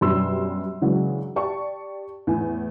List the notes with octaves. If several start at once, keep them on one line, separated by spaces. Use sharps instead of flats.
F#2 B2 G3 D4 C6 E6
C#3 E3 F#3 G#3 D4 F#4
G4 D5 A5 C#6
E2 A2 G#5